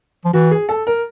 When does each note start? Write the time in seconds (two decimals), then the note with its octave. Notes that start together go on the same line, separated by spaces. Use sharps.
0.25 F3
0.33 E3 F#4
0.51 G#4
0.69 A4
0.87 A#4